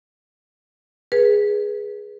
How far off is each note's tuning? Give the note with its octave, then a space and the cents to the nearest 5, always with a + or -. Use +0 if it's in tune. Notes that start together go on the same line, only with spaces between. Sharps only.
G#4 +0 B4 -30